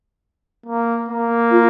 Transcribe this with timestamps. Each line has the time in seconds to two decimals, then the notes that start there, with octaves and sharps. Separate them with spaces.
0.66 A#3
1.09 A#3
1.51 F4